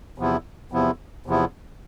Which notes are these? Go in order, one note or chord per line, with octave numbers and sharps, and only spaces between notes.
E2 C3 F3 B3 E4
E2 C3 F3 B3 E4
E2 C3 F3 B3 E4